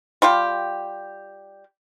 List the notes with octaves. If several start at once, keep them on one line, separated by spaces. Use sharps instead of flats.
G3 F4 G4